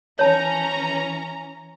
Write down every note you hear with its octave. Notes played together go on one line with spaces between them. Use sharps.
E3 C#4 C#5 A5 A#5